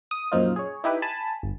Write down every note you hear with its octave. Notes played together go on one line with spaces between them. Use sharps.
D#6
F#2 A#2 F3 D#4 F4
G#4 C#5
D#4 E4 G4 B4
G#5 A5 B5
G1